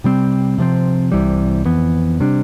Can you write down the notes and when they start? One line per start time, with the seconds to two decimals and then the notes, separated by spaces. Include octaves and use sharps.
0.04 C3 G3 C4
0.58 C3 F3 C4
1.12 C2 C3 E3 G3
1.65 F2 E3 B3
2.20 C3 G3 D4